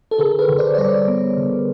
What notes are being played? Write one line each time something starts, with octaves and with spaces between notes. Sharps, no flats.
A4
D3 G#4 A#4
A4 B4
D3
C5 D5
C#5
G3 C5 D5
B3
D3